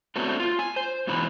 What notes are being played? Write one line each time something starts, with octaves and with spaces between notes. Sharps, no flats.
A3 B3 C4 D4 F#4 B4
F4
G#5
C5
G#2 B2 E3 B3 B4